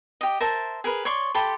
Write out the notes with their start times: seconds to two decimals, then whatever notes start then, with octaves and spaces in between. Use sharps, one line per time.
0.21 G4 D#5
0.40 A#4 C5 E5 A5
0.84 G#4 A#4 B4
1.05 C#5 D5 C6 C#6
1.34 G4 A4 B5 C6